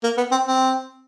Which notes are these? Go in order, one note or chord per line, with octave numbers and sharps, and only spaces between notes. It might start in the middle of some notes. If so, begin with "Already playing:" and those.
A#3
B3
C4
C4